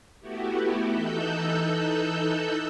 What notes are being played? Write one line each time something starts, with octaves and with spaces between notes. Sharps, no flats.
A3 B3 E4 F#4 G4
E3 D#4 A4 E6 F#6 G6